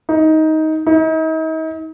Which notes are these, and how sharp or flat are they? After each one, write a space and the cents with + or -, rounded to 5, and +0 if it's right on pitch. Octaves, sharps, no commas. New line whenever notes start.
D#4 +15
D#4 +40